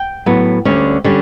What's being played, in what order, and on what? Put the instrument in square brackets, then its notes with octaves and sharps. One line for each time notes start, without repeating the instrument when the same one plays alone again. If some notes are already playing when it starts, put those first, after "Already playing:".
Already playing: [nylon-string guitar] G5
A2 F#3 B3
D2 D3 G3 C#4
D3 G3 C#4